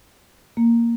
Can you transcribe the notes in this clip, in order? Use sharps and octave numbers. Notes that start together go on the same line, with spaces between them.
A#3